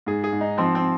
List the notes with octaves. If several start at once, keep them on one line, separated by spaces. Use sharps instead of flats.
G#2 G#4
G#4
G#2
D#4
F3 C4
C4